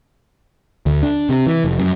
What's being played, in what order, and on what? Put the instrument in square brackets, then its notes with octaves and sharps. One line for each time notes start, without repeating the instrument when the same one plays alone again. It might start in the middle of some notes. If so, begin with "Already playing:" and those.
[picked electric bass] D2
D4
C3
E3
F1
F#2